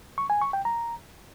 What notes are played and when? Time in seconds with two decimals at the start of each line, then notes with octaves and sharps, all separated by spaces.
0.18 C#6
0.30 G#5
0.41 C#6
0.53 G5
0.65 A#5